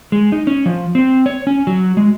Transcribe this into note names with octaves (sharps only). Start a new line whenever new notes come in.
G#3
D#4
C#4
F3
C4
C#5
C#4
F#3
G#3